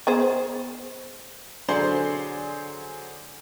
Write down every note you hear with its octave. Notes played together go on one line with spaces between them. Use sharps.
B3 G#4 C5
D3 F#3 G#4 C5 D5 G7